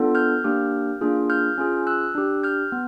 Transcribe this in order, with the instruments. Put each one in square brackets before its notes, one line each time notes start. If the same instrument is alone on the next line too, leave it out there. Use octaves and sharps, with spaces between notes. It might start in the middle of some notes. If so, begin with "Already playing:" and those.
Already playing: [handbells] B3 D4 F4 A4
F6 G6
A#3 D4 G4
A#3 D4 F4 G#4
F6 G6
C#4 F4 G#4
E6 F#6
D4 G4
F6 G6
B3